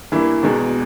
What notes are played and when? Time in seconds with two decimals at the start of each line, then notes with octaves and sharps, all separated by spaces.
0.12 G2 E3 A#3 E4
0.42 E1 E2 B2 G#3